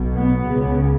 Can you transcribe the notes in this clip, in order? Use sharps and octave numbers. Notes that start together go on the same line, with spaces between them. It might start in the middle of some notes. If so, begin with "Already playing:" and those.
Already playing: B1 B2
B3
C#2 C#3